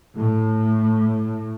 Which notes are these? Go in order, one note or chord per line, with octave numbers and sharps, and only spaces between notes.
A2